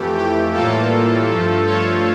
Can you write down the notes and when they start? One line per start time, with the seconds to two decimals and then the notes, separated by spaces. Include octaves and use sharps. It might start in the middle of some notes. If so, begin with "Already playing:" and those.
Already playing: F2 E3 A3 G4
0.16 G4
0.53 A2 E3 G3 A#3 F4 A4
1.30 G2 F3 A3
1.67 A4 C#5